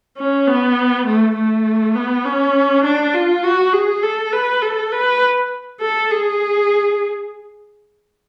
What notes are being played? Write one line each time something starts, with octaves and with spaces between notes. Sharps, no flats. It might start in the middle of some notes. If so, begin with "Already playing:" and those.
C#4
B3
A3
A3
B3
C#4
D4
F4
F#4
G#4
A4
B4
A4
B4
A4
G#4